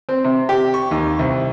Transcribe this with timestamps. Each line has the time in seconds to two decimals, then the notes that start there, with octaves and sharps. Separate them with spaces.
0.09 C4
0.24 C3
0.49 G4
0.74 C#6
0.91 D#2
1.19 C2